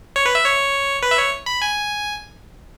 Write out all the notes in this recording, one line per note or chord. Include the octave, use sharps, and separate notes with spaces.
C#5
B4
E5
C#5
B4
E5
C#5
B5
G#5